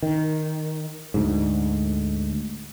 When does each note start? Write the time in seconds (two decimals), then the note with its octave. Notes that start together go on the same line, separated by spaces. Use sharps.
0.03 D#3
1.14 D2 G#2